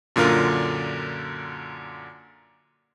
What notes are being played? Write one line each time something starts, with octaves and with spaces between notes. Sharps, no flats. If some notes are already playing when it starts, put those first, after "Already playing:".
F#2 A#2 D3 F4 A#4